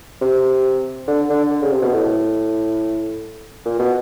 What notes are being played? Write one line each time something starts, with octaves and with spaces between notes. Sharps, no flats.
C3
D3
D3
D3
C#3
C3
B2
A2
A#2
B2